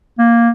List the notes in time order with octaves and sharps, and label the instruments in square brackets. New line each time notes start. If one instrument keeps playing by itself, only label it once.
[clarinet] A#3